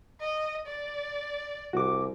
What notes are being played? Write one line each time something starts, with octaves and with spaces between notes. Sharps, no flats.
D#5
D5
C2 F#4 D6